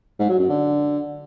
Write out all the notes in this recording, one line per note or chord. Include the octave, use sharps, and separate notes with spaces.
G#2
F#3
F#2
D3